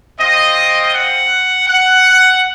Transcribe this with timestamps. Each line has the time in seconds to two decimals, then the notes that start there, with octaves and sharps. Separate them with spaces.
0.19 C4 F4 D#5
0.93 F#5
1.67 F#5